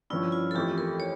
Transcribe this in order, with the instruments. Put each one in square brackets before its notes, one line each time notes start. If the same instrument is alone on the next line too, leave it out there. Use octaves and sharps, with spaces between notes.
[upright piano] G2 F3 C#4 [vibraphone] E4
[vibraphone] F4
A4
[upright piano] F2 E3 A3 E4 [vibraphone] G4
[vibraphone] A#4
C#5